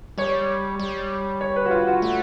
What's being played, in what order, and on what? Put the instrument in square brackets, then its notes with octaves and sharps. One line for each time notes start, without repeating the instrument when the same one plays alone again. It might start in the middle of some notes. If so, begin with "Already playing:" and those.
[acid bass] G3 [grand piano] C#5
[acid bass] G3
[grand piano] C#5
B4
F#4
F4
F#4
[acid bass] A3